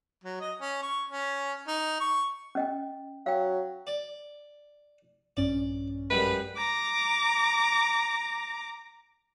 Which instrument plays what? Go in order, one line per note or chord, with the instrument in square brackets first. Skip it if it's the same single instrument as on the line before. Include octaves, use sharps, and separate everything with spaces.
[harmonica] F#3
D#5
C#4
C#6
C#4
D#4
C#6
[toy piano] C#4 D#5 G5
[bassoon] F#3 [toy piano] F5 G5
[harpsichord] D5
[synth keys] A#1 G2 C#4 [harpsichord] D5
[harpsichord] F#2 G3 G#3 [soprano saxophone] B4
[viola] A#5 D6